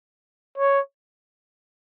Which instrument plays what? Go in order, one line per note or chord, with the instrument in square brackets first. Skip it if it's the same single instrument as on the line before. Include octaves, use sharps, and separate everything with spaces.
[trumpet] C#5